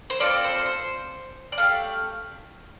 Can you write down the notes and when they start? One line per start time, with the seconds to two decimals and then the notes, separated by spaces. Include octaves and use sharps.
0.10 C5
0.20 C4 F4 A4 D5
0.44 C5
0.66 C5
1.52 D5
1.58 A3 D4 G4 F5